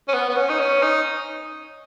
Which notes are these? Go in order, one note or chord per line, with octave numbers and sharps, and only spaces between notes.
C#4
B3
B3
C#4
D#4
C#4
D#4